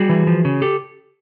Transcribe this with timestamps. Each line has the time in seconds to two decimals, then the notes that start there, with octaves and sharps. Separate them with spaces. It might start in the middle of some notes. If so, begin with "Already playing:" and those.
Already playing: G3 F#4 G#4
0.09 E3
0.27 F3
0.45 C#3
0.62 G4 A4